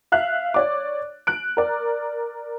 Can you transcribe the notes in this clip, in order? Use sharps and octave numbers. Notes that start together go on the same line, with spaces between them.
E5 F5 F#6
C#5 D5 D6
F#6 D7
A#4 D5